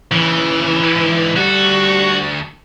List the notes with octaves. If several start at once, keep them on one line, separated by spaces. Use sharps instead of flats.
D#2 C#3 E3
G#2 D3
D2 G3 F#4 A4